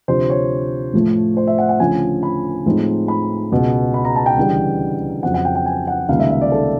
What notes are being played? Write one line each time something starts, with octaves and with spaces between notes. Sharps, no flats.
D2 C3 F3 C5
C#5
A2 F3 A3
C5
E5
F#5
F#5
D2 C#3 F3 A3 C#4 G#5
B5
A2 F3 G#3 C4 D#4
B5
C#2 B2 G#3
B5
A#5
A5
G5
D2 C#3 E3 G3
F2 C#3 F#3 F#5
F#5
G5
G5
G#5
F#5
C#2 C3 D#3 G3 A#3 F5
E5
E5
D5
A4